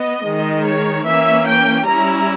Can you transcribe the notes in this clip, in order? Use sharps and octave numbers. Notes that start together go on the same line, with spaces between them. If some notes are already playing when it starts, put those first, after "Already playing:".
Already playing: B3 D#5
D#3 G#3 D#4
C#5
E3 A#3 C#4 E5
G5
G3 C#4 E4 A#5